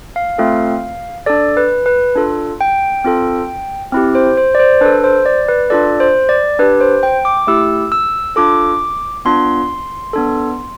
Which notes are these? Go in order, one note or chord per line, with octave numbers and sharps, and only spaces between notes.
F5
A3 C4 F4 A4
D4 A4 D5
B4
B4
D4 F4 A4
G5
C4 F4 A4
C4 E4 G4
C5
C5
D5
C5
D4 A4 B4
C5
D5
B4
D4 F4 A4 D5
C5
D5
D4 G4 B4
C5
G5
D6
A3 E4 G4 E6
E6
D4 F4 A4 D6
B3 D4 F4 C6
B3 D4 A4